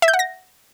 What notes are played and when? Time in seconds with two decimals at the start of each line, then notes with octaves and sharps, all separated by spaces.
0.02 E5
0.08 G6
0.14 F#5
0.19 A#6